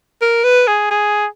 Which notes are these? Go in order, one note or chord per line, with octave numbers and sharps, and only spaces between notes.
A#4
B4
G#4
G#4